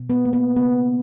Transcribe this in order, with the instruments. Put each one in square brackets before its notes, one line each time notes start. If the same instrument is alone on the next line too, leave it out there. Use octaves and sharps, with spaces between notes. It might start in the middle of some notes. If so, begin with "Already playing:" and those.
Already playing: [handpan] B2
B3
A#3
B3
C#3 B3